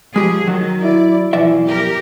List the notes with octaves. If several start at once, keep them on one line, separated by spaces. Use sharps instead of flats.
F3 G#3 G4 G#4
D#3 F#3
E4 D5
B1 E3 F3 D5 E5
G4 A#4